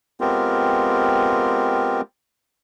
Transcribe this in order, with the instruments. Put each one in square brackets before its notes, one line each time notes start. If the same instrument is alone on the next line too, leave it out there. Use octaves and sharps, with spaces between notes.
[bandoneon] G#3 B3 C4 F4 G4 A#4